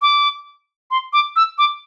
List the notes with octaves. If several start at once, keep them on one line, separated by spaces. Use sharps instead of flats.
D6
C6
D6
E6
D6